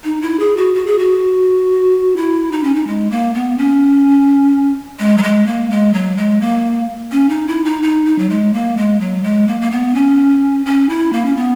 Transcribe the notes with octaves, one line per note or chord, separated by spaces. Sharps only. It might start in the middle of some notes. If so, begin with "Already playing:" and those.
D#4
E4
G#4
F#4
F#4
G#4
F#4
E4
D#4
C#4
D#4
G#3
A#3
B3
C#4
G#3
F#3
G#3
A#3
G#3
F#3
G#3
A#3
C#4
D#4
E4
D#4
D#4
D#4
F#3
G#3
A#3
G#3
F#3
G#3
A#3
A#3
B3
C#4
C#4
E4
A#3
C#4
B3